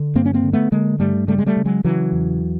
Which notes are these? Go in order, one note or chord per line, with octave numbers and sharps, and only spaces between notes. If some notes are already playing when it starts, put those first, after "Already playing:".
Already playing: D3
G2 A#3 C4
C#4
A#3 C4
D3
A3 B3
D3 G#3 A#3
G2 G3 A3
C#3 G3 A3
G#3
G3 A3
C#3
F#3 G#3
C#3 E3 F#3
E2